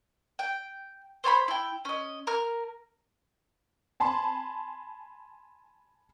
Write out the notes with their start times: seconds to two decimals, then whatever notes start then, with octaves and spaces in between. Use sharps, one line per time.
0.39 G5
1.24 C5 C#5 G#5 B5
1.48 E4 G5
1.85 C#4 D#5
2.27 A#4 F6
4.00 G#5 A5 B5 C6